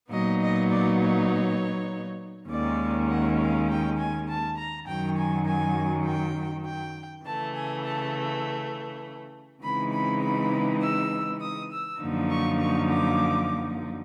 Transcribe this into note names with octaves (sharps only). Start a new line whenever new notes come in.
A#2 F#3 B3 D#4 D#5
D#5
D5
C#5
D#2 D#3 G#3 C#4 D5
F#5
F5
G5
G#5
A5
A#5
F#2 D#3 F#3 G5
G#5
G#5
G5
G5
C#3 E3 A3 A5
G#5
A5
C#3 E3 G#3 C4 D#4 B5
B5
B5
E6
D#6
E6
F#2 D3 F3 A#3 D#4
C#6
C#6
D6